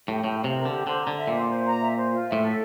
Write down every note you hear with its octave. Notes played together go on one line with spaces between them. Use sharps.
A2 G4
A2 G4
F5
C3
A#4
D3 G4
D3 C5
D3 A#5
E5
A#2
C5
C5
A#5
E5
C5
F4
E5
A2
A4